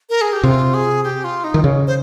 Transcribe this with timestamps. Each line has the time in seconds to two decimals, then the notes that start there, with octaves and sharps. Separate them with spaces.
0.09 A#4
0.21 G#4
0.33 G4
0.43 C3 F4
0.74 G#4
1.04 G4
1.24 F4
1.44 D#4
1.54 D#3
1.64 C#3
1.87 C5